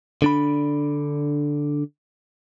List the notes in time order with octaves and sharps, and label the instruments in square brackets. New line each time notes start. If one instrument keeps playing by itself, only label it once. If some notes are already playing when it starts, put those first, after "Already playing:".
[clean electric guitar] D3 D4 B5